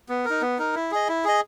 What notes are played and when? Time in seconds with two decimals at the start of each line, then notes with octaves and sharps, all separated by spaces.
0.09 B3
0.25 D#4 A#4
0.42 B3
0.59 D#4 A#4
0.75 E4
0.91 G#4 D#5
1.08 E4
1.24 G#4 D#5